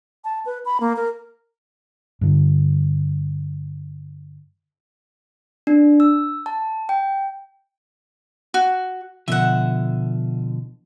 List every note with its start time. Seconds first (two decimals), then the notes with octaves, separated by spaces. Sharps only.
0.24 A5
0.45 B4
0.65 B5
0.80 A#3
0.96 A#4
2.21 G2 D3
5.67 D4
6.00 E6
6.46 A5
6.89 G5
8.54 F#4
9.28 B2 D3 F3 E5 F#5